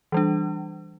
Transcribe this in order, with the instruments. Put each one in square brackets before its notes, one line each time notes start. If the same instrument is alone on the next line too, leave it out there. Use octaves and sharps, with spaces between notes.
[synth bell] E3 G3 D4